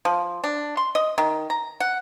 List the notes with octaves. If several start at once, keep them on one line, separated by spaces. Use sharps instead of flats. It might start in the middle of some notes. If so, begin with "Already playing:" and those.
F3
D4
C6
D#5
D#3
A#5
F#5